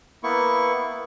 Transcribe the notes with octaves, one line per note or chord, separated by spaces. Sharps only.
A#3 B3 E4 C#6